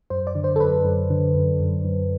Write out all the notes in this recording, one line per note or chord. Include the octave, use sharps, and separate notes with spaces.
F#2 C5
D5
D3
C5
A4
F#2 B4
F#2
D3
F#2
F#2
F#2